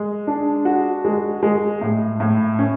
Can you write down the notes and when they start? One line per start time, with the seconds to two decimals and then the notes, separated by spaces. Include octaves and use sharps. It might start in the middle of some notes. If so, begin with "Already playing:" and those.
Already playing: G#3
0.27 D4
0.65 F#4
1.05 G#3
1.43 G#3
1.81 A2
2.20 A2
2.59 C#4